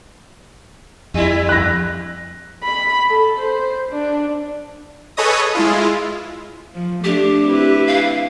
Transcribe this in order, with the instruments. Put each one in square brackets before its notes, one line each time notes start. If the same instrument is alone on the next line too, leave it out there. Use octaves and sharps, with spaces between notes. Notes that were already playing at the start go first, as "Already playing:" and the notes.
[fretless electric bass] F2 [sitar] G3 E4
[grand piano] F#6 A#6
[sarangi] B5
A4
C5
D4
[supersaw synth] G#4 A4 B4 C#5 D#5 D#6
G#3 E4 F4
[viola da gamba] F3
[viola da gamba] A3 D4 [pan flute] G4
[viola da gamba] C4 E4 B4
[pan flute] F5